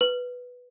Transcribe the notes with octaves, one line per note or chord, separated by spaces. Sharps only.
B4